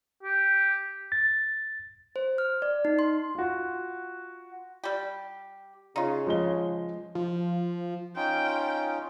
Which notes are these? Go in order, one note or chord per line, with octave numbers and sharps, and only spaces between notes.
G4
A6
C5
F6
D5
D#4
C6
F4 F#4
G3 G4
C#3 D#4 F4
F3 G#3 G7
F3
C#4 D#4 F4 G5